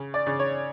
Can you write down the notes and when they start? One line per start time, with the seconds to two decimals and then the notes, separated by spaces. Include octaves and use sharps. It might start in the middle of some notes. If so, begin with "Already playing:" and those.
Already playing: C#3
0.14 D5
0.26 C#3
0.39 C#5